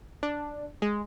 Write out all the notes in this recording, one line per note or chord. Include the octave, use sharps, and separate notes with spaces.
D4
G#3